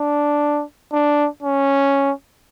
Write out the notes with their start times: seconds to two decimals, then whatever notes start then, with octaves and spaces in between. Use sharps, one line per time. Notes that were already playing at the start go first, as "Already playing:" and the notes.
Already playing: D4
0.93 D4
1.43 C#4